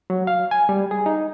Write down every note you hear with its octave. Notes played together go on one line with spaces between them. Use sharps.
F#3
F5
G#5
G3
G#4
D#4